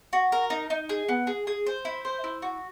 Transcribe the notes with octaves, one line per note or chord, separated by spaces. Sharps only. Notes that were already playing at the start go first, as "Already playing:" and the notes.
F#4
A#4
D#4
D#4
G#4
B3
G#4
G#4
C5
E4
C5
E4
F#4